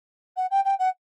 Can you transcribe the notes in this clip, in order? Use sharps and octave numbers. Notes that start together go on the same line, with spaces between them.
F#5
G5
G5
F#5